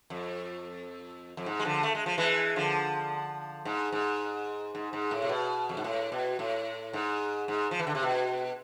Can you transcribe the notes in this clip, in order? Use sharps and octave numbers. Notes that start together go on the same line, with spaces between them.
F2
F2
G#2
G#3
D3 F3
A3
G#3
F3
E3 G#3
D3 F3
G#2
G#2
G#2
G#2
A2
C3
B2
F2
G#2
A2
B2
A2
G#2
G#2
F3
E3
D3
C3
B2